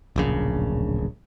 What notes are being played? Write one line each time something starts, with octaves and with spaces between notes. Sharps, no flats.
D1 A#1 C#3